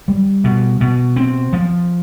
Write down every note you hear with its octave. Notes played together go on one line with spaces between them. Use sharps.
G3
B2
B2
C4
F3